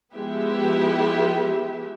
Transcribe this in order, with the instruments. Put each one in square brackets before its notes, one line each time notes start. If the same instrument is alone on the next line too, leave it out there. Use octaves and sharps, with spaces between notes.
[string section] F3 G#3 B3 E4 G4 E5